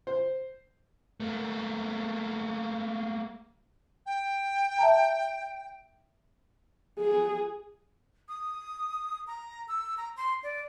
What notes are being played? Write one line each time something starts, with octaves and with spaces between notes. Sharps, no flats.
C5
A3 A#3
G5
E5 A5 A#5
G#4
D#6
A#5
E6
A#5
C6
D5